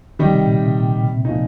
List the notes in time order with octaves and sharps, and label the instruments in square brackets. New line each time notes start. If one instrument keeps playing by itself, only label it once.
[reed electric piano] C3 [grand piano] D#3 G3 D#4 G4
[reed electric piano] C3
A#2
C3
A#2
A#2
C3
[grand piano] A#2 F3 D#4